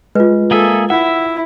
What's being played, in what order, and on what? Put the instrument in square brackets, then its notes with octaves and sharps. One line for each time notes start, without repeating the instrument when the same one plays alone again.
[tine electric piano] G#3 [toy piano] F4 B4
[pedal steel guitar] A#3 G#4 E5 [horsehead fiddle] A4
[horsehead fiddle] E4 [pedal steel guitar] E5 [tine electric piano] F#5